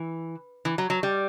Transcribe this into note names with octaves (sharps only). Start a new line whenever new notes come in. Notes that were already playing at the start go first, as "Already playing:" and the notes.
Already playing: E3
E3
F#3
F#3
G3